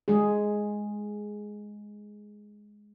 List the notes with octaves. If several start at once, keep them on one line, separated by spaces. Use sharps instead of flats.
G#3 G#4